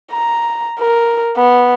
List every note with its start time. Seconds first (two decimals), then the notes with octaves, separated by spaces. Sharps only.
0.12 A#5
0.79 A#4
1.37 B3